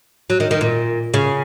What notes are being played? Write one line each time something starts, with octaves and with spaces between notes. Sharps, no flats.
F#3
D#3
D#3
A#2
C#3